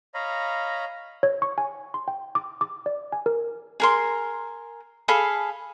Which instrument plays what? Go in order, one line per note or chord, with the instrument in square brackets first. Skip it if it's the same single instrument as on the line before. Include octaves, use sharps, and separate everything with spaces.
[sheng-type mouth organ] C#5 D#5 F5 A#5 B5
[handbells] C#5
C#6
G#5
C6
G5
D6
D6
D5
G#5
A#4
[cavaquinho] G#4 A#4 C6
G#4 A4 F5 B5